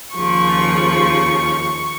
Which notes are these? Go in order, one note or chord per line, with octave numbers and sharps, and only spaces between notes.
D#2 C#3 F3 C#6